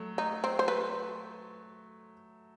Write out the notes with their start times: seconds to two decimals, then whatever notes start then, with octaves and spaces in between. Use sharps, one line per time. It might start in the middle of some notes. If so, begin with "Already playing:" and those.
Already playing: F#3 A3
0.18 D#4
0.44 C4
0.59 C5
0.68 B4